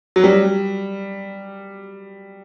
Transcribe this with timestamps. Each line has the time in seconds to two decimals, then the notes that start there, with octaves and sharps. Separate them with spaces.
0.16 F#3
0.24 G3